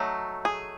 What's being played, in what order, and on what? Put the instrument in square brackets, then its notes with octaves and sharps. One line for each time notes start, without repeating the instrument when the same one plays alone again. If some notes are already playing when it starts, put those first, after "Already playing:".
Already playing: [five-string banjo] F#3 A3 D#4
G#4